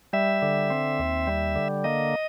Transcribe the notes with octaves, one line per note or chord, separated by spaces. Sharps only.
G3 E5
D3
C4
D#2
G3
D3
A#3 D#5